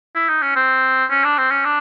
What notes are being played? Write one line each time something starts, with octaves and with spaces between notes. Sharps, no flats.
E4
D#4
C#4
C4
C#4
D4
C4
C#4
D4